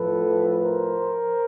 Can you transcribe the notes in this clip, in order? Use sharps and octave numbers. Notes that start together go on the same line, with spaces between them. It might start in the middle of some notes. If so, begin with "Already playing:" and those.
Already playing: A2 F3 A4 B4
A#4 C5